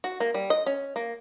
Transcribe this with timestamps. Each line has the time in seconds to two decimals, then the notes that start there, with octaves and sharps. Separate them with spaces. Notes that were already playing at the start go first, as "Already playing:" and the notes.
0.04 F#4
0.20 A#3
0.34 G3
0.50 D#5
0.66 C#4
0.96 A#3